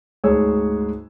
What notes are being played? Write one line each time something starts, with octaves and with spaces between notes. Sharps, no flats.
D2 G#2 G#4 C#5 E6